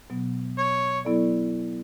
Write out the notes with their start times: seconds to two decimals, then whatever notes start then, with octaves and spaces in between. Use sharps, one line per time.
0.10 B2 F#3 B3
0.58 C#5
1.05 F#3 B3 E4 A4 D5